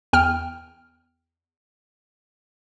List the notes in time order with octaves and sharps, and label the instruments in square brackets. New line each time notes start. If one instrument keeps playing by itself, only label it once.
[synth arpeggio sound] E2 G5 F6